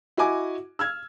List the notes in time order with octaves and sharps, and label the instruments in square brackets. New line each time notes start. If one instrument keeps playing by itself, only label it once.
[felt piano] E4 F#4 D#5 G#5 D6
E6 F6 G#6